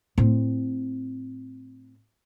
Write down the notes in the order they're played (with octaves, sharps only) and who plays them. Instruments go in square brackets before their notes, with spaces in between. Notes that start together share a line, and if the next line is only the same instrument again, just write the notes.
[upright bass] A2 C4